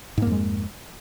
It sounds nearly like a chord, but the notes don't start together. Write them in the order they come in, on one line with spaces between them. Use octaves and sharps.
G#2 A#3 F2 G#3